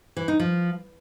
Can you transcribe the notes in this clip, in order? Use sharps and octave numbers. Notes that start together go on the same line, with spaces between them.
E3
D#4
F3